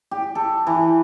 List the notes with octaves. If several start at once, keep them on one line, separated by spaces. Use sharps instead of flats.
G4
A4
E3